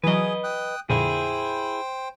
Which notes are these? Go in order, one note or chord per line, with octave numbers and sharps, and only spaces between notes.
E3 F#3 G#4 B4 D#5
G5 D#6 F#6
F2 A#2 D3 E4 G#4 C5 G5